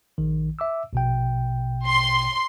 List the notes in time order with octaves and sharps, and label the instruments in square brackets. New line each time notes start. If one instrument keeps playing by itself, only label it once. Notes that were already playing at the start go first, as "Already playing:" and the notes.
[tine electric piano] A#1 D#3
E5 D6 E6
A#1 B2 G5
[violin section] C6